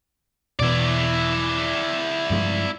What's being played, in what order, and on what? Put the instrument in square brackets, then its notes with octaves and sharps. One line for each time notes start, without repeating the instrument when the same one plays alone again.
[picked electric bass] E1 B2 E3 [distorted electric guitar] E4 D5
[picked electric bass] G2 F3 G#3